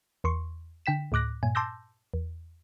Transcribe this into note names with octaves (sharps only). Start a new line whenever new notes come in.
E2 C6 C#6
D3 G5 B6 E7
D2 A2 D6 F#6 A#6
G2 A#2 G#5
A5 C6 D6 E6 G6 A#6
E2